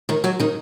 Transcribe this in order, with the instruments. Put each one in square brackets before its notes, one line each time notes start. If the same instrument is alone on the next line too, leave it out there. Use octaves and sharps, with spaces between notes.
[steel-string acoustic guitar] D#3 D#4
F#3 F#4
D#3 D#4